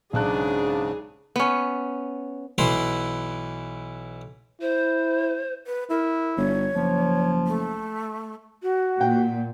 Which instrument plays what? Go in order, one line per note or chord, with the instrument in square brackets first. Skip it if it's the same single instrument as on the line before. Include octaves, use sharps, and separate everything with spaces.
[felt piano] B1 A5 F#6 [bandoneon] G#2 C#3 [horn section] D4 [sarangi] G#4
[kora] B3 C#4
[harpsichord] B1 E3 E4 C6
[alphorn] E4 [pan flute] C5
[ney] B4
[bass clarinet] E4 [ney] A#4
[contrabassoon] G1 [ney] C#5
[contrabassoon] F#1 [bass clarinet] F3
[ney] A3
[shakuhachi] F#4
[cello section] A#2 [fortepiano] F#5 G5